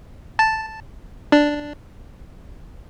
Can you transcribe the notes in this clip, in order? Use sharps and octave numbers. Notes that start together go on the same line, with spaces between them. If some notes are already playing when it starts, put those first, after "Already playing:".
A5
D4